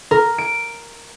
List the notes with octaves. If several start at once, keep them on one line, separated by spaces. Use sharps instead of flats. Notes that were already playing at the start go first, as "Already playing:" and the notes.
A#4
D7